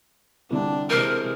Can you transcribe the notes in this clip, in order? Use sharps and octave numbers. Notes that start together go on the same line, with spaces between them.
C2 D3 G3 D4
C3 E3 G#3 A#4 G6 C7 D7